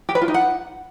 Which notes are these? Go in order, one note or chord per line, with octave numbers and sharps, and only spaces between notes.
G4
B4
F4
D#4
F#5